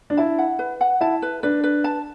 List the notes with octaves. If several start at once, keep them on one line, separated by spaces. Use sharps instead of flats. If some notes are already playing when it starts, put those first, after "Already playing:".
D4
E4 A5
F#5
B4
F#5
E4 A5
B4
D4 B4
B4
A5